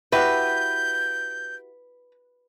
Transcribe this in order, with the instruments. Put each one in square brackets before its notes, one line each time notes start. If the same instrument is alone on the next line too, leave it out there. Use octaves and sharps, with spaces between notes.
[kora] E4 F#4 G4 [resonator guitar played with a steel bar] B4 [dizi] G6